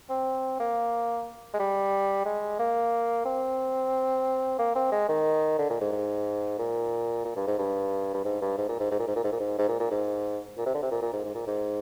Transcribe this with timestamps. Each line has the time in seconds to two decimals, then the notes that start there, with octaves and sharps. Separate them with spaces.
0.10 C4
0.59 A#3
1.54 G#3
1.59 G3
2.25 G#3
2.59 A#3
3.25 C4
4.59 A#3
4.75 C4
4.92 G#3
5.08 D#3
5.58 D3
5.70 A#2
5.81 G#2
5.92 G#2
6.58 A#2
7.25 A#2
7.36 G2
7.47 G#2
7.58 G2
8.14 G2
8.24 G#2
8.41 G2
8.58 G#2
8.69 A#2
8.80 G#2
8.91 G#2
8.99 A#2
9.07 G#2
9.16 A#2
9.24 G#2
9.32 A#2
9.40 G#2
9.58 G#2
9.68 A#2
9.80 A#2
9.91 G#2
10.58 A#2
10.66 C3
10.74 D3
10.82 C3
10.91 A#2
11.02 A#2
11.13 G#2
11.24 G#2
11.35 A#2
11.47 G#2